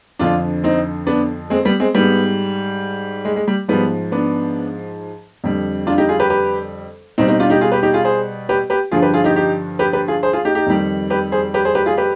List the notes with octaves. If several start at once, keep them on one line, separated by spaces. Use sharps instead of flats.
F2 D3 F3 D4 F4
C4 D#4
B3 D4
G#3 C4
G3 B3
G#3 C4
G#2 G3 B3
G#3
G#3
G3
G#2 F3 G3 B3
B3 D4
F2 D3 G3
D4 F4
D#4 G4
F4 G#4
G4 B4
G4 B4
B2 G3 C4 D#4
C4 D#4
D4 F4
D#4 G4
F4 G#4
G4 B4
D#4 G4
F4 G#4
G#4 C5
G4 B4
G4 B4
G2 D3 F3 F4 G#4
G4 B4
F4 G#4
D#4 G4
D#4 G4
G4 B4
G4 B4
F4 G#4
G#4 C5
F4 G#4
D#4 G4
D#4 G4
F2 D#3 G3
G4 B4
G#4 C5
G4 B4
G#4 C5
G4 B4
F4 G#4
G4 B4